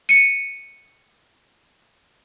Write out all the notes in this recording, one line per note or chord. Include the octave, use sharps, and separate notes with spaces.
C#7 D#7